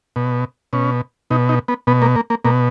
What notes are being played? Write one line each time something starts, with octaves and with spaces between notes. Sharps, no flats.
B2
B2 C#4
B2 D#4
D#4
B3
B2 B3
A#3
A#3
A#3
B2 A#3